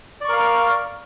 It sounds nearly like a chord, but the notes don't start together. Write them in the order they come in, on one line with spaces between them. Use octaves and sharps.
D5 C#6 A#4 F5